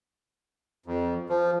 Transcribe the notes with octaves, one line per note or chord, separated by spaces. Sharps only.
F2
F3